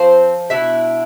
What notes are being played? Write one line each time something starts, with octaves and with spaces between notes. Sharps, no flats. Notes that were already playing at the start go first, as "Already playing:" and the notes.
Already playing: F3 C4 C5
B2 B3 D4 E4 E5